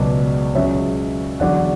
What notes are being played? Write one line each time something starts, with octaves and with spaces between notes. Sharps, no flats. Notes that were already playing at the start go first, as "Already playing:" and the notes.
Already playing: C#2 B2 F#3 B4 D5
C#2 C#3 F#3 C#5 E5
E2 D3 F#3 D5 F#5